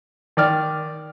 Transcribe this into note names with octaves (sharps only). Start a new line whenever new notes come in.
D#3 D5 F6